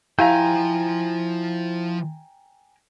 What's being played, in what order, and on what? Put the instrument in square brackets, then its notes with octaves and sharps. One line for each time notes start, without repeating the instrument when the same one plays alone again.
[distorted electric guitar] F3 C5 [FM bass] E4 [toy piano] G4 F5 [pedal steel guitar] G5 G#5 A#5